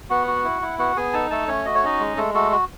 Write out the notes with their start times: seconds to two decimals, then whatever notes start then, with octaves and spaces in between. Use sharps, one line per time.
0.10 B3 F#4 F#5
0.27 F#4
0.44 E4
0.62 E4
0.79 B3 F#4 F#5
0.97 B3 G#4 G#5
1.13 D#4 A4 A5
1.30 A3 A4 A5
1.48 A3 C#4 C#5
1.65 F#4 D#5
1.75 C#5
1.83 C#4 D#4 D#5
2.00 G#3
2.17 G#3 A3 A4
2.34 A3 F#4 A4
2.52 F#4